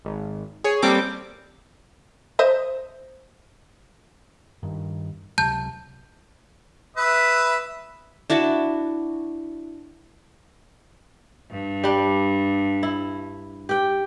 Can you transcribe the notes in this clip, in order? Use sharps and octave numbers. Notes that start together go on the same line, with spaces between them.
G#1
G#4 C#5
G3 A#3 C4 A4 D6
C5 D#5 E5
G2 D#3
C#2 C3 F#3 A5 G6
B4 E5 D#6
D4 E4 F#4 A5
G2
G3 D4
E4
G4 G5